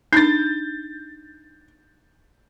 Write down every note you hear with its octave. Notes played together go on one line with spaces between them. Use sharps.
D4 D#4 G6 A6